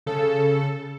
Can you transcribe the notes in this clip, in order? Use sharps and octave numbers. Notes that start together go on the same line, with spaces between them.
C#3 A4